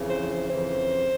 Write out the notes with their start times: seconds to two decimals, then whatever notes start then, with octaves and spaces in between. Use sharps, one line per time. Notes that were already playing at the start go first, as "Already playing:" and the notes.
Already playing: F2 C#3 E3
0.10 C5
0.30 C5
0.50 F2 C#3 E3 C5